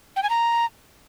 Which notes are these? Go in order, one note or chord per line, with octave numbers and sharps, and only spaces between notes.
G5
G#5
A#5